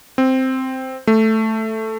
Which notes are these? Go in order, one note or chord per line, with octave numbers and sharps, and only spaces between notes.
C4
A3